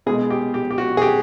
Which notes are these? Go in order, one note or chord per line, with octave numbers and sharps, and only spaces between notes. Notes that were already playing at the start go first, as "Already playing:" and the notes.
B2 G#3 G#4
G4
G4
G4
F#4
G#4
G4